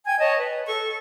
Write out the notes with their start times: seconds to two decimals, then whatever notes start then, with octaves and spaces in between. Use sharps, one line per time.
0.06 G5 G#5 G#6
0.19 C#5 D#5 A5
0.38 B4
0.67 A4 C#6